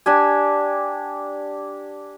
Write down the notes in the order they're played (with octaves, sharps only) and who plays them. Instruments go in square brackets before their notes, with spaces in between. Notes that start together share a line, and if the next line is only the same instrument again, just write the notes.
[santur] D4 G4 G#5